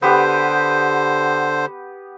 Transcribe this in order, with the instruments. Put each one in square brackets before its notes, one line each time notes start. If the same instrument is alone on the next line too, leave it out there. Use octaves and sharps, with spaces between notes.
[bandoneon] D3 C5 [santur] B3 G4